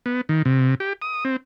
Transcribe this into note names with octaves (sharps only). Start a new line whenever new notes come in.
B3
D#3
C3
G4
D#6
C4